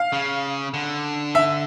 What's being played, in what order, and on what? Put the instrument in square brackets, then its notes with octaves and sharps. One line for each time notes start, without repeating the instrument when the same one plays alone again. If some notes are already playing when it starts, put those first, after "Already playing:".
Already playing: [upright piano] F5
[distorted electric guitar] C#3
D3
[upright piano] E5